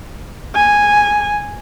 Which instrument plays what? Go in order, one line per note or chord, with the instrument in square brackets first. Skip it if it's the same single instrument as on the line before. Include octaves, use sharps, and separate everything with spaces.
[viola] G#5